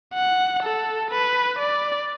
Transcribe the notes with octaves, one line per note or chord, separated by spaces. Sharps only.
F#5
A4
B4
D5